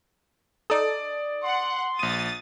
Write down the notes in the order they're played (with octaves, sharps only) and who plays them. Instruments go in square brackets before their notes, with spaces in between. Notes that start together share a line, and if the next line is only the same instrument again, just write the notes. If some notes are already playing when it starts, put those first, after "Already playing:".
[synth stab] D#4 A4 [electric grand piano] D5 D#6
[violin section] F#5 [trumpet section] C6
[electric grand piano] A#1 D#7 [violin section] D#6 A6